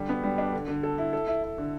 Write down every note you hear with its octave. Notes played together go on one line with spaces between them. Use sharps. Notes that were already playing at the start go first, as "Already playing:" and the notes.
Already playing: D3 G3
B3
G3
D4
D3
D3
A4
E4
A4
E4
E4
D3